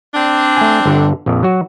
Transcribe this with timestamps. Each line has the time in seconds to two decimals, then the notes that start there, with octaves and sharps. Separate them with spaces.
0.14 C4 D4
0.57 A3 G#5
0.85 G1 D3 A4
1.26 A#1 F2
1.43 F#3 F#4